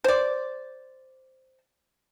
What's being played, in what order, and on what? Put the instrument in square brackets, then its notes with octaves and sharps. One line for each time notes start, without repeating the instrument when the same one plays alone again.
[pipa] C5 D5